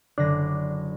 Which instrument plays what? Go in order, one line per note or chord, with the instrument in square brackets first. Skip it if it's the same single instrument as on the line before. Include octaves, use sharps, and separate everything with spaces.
[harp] F#1 D3 A#6 [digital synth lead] D4